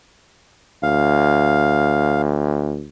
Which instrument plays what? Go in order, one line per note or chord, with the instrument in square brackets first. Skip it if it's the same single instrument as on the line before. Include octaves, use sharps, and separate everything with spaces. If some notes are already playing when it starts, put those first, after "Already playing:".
[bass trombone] D2 [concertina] F5